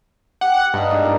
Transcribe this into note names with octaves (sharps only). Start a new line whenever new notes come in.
G4 F#5
G2 D#4 F5
G#2 D4 A#5
A#2